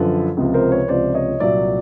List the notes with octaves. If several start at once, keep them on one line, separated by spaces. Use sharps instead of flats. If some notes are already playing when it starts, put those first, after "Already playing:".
Already playing: F#2 D3 F3 A4 B4
C#2 C3 F3
A#4 C5
B4 C#5
C#2 C3 F3 C5 D5
C#5 D#5
C2 A#2 F#3 D5 E5